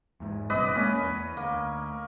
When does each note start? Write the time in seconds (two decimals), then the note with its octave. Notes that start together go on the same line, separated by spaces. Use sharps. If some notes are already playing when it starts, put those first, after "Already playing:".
0.20 E2 G#2
0.50 A#1 G2 C3 B4 D5 D#5
0.75 G#3 A#3 C4 C#4
1.03 E2
1.37 D2 A#3